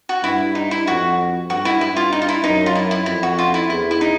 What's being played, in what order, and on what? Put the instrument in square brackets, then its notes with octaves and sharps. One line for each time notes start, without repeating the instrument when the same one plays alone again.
[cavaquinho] F#4
[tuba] G2 [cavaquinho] E4
[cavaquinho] D#4
E4
[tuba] F2 [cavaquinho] F#4
[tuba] G2 [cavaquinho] F#4
[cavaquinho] E4
[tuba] G2 [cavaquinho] E4
[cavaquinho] F4
D#4
F4
E4
[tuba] F#2 [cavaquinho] D#4
[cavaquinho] F4
E4
E4
[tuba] F2 [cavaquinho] E4
[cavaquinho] F#4
F4
E4
[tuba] E2 [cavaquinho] E4
[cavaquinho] E4
D#4